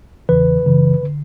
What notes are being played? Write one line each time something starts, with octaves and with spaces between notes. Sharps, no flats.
E2 C#3 E3 B4
F#2 C#3 E3
D3